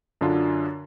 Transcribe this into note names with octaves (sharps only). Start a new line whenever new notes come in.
F#2 D3 D4 F4